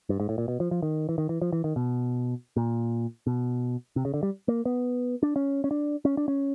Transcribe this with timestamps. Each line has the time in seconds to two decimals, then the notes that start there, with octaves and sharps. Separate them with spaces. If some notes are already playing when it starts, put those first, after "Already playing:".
0.09 G2
0.20 G#2
0.29 A2
0.38 A#2
0.48 B2
0.60 F3
0.71 F3
0.82 D#3
1.09 E3
1.18 D#3
1.29 E3
1.41 F3
1.53 E3
1.64 D#3
1.76 B2
2.56 A#2
3.27 B2
3.96 C3
4.05 C#3
4.14 D3
4.23 G3
4.48 A#3
4.65 B3
5.23 D4
5.36 C#4
5.64 C#4
5.71 D4
6.05 C#4
6.17 D4
6.28 C#4